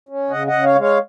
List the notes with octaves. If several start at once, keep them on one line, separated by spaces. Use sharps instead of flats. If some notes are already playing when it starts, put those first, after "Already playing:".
C#4
C#3 D#5 F#5
D#5 F#5
C#3
C#5 F5
G#3
C#5 F5